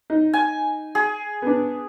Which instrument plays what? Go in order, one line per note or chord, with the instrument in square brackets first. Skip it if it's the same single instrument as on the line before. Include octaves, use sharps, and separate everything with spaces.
[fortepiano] D#4
[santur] G#5
G#4
[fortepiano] B3 D4